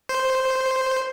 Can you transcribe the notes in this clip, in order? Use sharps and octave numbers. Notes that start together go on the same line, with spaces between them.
C5